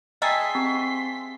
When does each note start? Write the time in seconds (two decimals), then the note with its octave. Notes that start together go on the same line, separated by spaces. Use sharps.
0.22 G#4 D#5 E5 G5 A5 A#5 C6 B6
0.55 C4 G4